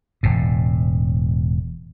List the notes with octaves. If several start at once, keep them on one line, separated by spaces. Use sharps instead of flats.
E1 A2